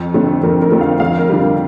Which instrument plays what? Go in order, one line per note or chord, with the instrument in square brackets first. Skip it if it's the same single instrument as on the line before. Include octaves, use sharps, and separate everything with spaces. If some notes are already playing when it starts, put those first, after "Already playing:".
Already playing: [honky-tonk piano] F2
D3 A3 C4
F2 A#4
A#4
D3 A3 C4
F5
F2 F5
A#4
D3 G3